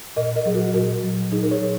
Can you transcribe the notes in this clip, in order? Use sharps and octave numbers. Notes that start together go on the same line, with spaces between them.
A#2 A#4 D#5
A#4 D#5
F#3 G#4
F#4 A#4
A#2 F#4 A#4
F#3
A#2 D#4 G#4
A#4
G#4 C#5
F#3